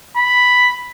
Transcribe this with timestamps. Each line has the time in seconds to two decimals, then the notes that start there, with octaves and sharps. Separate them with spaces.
0.17 B5